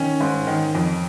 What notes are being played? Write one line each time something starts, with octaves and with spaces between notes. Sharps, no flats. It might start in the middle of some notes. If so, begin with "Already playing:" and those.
Already playing: D#3 C#4
G#2
D#3
F2